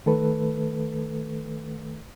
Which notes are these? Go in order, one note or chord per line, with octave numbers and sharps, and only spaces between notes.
D#3 A3 A4 B4